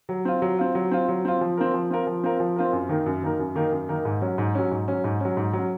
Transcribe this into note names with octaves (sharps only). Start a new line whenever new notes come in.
F#3
C4 F4
F#3
C4 F4
F#3
C4 F4
F#3
C4 F4
F3
C4 F4 A#4
F3
C4 F4 A#4
F3
C4 F4 A#4
F3
C4 F4 A#4
F#2
D#3 A#3 D#4 A#4
F#2
D#3 A#3 D#4 A#4
F#2
D#3 A#3 D#4 A#4
F#2
D#3 A#3 D#4 A#4
G#2
F#3 C#4
G#2
F#3 C#4
G#2
F#3 C#4
G#2
F#3 C#4
G#2
F#3 C#4